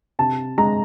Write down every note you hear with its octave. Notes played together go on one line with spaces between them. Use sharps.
C3 A5
G#3 A#5